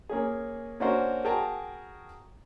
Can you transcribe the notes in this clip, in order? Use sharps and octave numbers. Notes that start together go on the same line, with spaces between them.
A#3 C#4 G#4
A#3 C#4 D4 F#4 A#4 C5
F#4 G#4 A#4 G5 A5 A#5